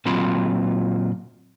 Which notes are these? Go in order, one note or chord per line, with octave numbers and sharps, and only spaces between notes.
A#2 F#3 C4 F4 B5 C6